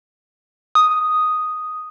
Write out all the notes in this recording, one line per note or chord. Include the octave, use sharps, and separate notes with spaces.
D#6